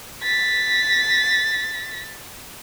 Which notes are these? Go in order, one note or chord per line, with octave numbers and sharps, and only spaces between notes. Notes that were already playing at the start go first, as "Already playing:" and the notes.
A6 B6